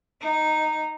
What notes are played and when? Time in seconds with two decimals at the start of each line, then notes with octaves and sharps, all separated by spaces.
0.21 D#4